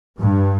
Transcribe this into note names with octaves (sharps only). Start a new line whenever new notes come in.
G2